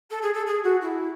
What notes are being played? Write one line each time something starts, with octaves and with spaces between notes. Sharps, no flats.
A4
G#4
A4
G#4
F#4
E4